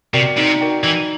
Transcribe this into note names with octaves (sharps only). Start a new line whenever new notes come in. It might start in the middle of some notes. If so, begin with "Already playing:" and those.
C3 F#4 A#4 D5 G5
C3 D#4
F#4 A#4 D5 G5
E3 D#4